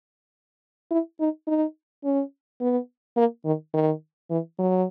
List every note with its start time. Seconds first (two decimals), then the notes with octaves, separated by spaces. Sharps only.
0.91 E4
1.20 D#4
1.47 D#4
2.04 C#4
2.61 B3
3.17 A#3
3.45 D#3
3.74 D#3
4.30 E3
4.59 F#3